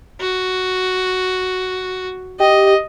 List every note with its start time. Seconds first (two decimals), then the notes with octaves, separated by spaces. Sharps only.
0.20 F#4
2.40 G4 D#5